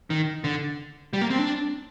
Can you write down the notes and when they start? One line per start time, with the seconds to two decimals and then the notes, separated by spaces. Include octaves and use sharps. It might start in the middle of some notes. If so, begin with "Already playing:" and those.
0.10 D#3
0.44 D3
1.13 G3
1.21 A#3
1.30 C4
1.39 D4